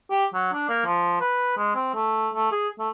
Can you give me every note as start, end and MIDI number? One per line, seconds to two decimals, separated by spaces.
0.10 0.26 67
0.34 0.52 54
0.53 0.66 62
0.69 0.85 58
0.86 1.19 53
1.20 1.54 71
1.57 1.73 56
1.75 1.93 60
1.94 2.29 57
2.34 2.49 57
2.52 2.68 68
2.79 2.89 57